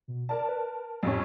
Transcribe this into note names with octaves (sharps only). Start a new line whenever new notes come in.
B2
A#4 D5 A5
B4
F2 A2 G3 C#4